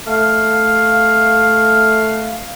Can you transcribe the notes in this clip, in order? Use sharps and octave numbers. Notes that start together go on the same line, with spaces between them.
A3 F5